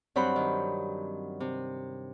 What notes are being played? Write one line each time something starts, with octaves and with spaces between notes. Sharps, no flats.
G2 F#3 C4 C5 F#5 B5
D#3
C3